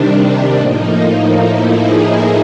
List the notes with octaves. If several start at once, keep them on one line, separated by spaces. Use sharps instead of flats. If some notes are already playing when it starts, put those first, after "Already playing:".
Already playing: C3 D#3 G3 D4
A2 F3 A#3 D#4
E4
G#4